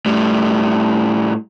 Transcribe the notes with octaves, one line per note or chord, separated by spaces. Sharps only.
A2 G3